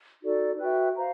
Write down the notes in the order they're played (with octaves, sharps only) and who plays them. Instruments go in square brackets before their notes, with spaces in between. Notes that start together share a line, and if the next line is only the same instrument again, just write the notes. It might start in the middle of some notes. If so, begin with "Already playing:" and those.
[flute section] D#4 F#4 A4 D5
F#4 B4 E5 G5
C5 F5 A#5